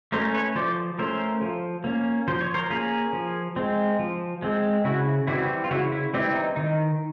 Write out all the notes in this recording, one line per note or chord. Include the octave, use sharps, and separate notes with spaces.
A3 C#4 A#4 C5
B4 C#5
F3 C5 D5
A3 C#4 A#4 C5
F3
A#3 C#4
F3 C5
C#5
A#4 C5
A#3 C#4 G#4 A#4
F3
G#3 C4
F3
G#3 C4
C#3 E4 F#4
E3 G3 C4 E4 F#4
F4
C#3 E4 F#4
E4
E3 G3 C4 E4
D#4
D#3 D#4